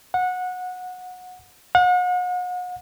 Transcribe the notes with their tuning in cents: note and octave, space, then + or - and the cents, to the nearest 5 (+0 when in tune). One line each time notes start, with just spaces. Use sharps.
F#5 -20
F#5 -40